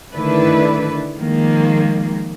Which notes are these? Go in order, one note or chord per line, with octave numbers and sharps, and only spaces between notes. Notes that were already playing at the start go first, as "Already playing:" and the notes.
D3 D#3 A3 D4 E4 B4
D#3 F3 G#3 A#3